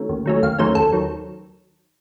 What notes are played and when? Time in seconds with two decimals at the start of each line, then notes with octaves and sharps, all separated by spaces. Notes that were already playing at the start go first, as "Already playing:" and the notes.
Already playing: D#3 F#3 A3 C#4
0.09 D#2
0.26 D#3 F#3 A3 C#4
0.43 D#2 F5
0.58 D#3 F#3 A3 C#4 C5
0.75 D#2 A4
0.93 D#3 F#3